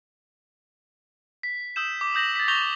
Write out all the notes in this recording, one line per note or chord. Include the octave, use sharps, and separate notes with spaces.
B6
D#6 E6 G6 E7
D6
D#6 G6 A#6 F#7
A6 B6
C#6 G6 A#6 F7 G7